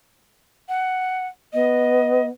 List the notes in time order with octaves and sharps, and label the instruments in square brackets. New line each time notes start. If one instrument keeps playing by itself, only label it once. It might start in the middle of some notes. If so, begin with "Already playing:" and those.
[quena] F#5
[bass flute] B3 [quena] D#5